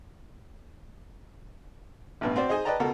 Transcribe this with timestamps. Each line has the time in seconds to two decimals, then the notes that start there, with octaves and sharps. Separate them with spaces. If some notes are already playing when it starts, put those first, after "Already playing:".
2.21 A1 G2 B2
2.36 C4 F#4 C5 D5
2.49 D#4 G#4 C5 D#5 G#5
2.65 B4 D5 D#5 G5 A5 A#5
2.80 C#2 B2 F#4 A4 A#4